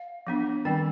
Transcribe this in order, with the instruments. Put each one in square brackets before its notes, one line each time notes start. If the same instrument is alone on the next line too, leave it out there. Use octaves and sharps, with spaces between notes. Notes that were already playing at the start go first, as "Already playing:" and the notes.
Already playing: [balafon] F5
F3 B3 D4
D#3 G3 C4 G5